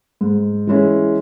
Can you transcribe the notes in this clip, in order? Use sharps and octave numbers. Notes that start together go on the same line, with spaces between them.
G#2
E3 G#3 C#4 E4